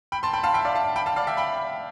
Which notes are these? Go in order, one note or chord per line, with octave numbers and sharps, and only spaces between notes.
G5 B5
A5 C6
G5 B5
F5 A5
E5 G5
D5 F5
F5 A5
G5 B5
F5 A5
D5 F5
E5 G5
G5 B5